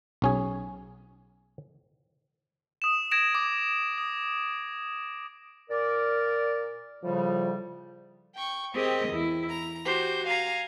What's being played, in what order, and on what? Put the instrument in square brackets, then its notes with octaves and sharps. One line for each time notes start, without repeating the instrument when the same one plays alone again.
[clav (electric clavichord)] B1 C#4 G#4
[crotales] D#6 E7
G#6 A#6 D7 E7
D6
D#6
[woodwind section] A#2 A#4 D5
[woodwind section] A2 C#3 G3 [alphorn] F3
[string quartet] G5 C#6
C4 G4 G#4 A#4 D#5
E2 E4
A#5
F#4 G4 C5
F5 G#5 A#5